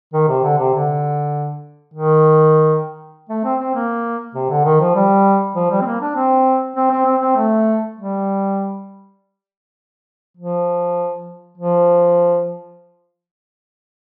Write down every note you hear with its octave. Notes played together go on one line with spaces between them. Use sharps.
D#3
C3
D3
C3
D3
D#3
A3
C4
C4
A#3
C3
D3
D#3
F3
G3
F3
G3
C4
A#3
D4
C4
C4
C4
C4
C4
A3
G3
F3
F3